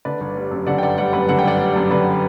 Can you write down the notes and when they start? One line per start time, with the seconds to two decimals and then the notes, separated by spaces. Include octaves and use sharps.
0.05 D3 B4 D5
0.21 G1
0.37 G3
0.51 F#2
0.67 D3 D5 F#5
0.78 G5
0.83 G1 D5 F#5
0.98 G3 D5 F#5
1.13 F#2 B4 D5
1.29 D3 F#5
1.39 G5
1.44 G1 D5 F#5
1.59 G3
1.76 F#2
1.91 D3 B4 D5